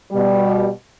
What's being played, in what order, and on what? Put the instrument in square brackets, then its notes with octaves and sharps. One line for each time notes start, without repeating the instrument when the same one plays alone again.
[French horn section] B2 G3